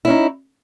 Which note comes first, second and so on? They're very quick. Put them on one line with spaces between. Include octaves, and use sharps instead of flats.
E4 C#4 D#4